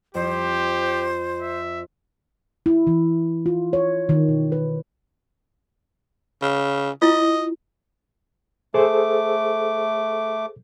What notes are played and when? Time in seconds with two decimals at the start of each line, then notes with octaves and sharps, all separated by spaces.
0.15 F2 G4 C5
1.41 E5
2.66 E4
2.87 E3
3.46 F4
3.73 C#5
4.09 D#3
4.28 B2
4.52 B4
6.42 C#3
7.02 E4 F4 D#5
8.74 A3 G#4 A4 C5 D6